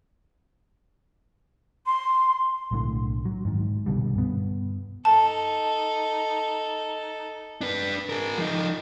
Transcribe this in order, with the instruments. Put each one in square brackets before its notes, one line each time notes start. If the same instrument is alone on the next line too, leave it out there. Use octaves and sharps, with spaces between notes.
[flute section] C6
[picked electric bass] B1 A2 D3
F#3
G#2 D#3
C2 B2 D3 G3
G2 B3
[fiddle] D#4 A4 [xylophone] A5
[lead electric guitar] D4 B4
G#4 A#4
F3 D#4